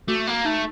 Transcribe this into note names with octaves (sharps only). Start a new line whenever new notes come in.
A3 F#4
A#3
A3 D#4